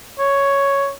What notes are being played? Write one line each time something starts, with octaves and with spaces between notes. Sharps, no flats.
C#5